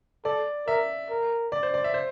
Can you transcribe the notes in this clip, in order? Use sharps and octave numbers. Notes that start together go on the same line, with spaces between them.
A4 D5
A#4 E5
A#4
D5
C5
D5
E5
C5